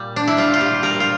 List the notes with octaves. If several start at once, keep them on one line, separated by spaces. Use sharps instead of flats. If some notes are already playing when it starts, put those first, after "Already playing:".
Already playing: A#2 G3
D4
E4
G3 F4
F4
G4
G3 A#4
F4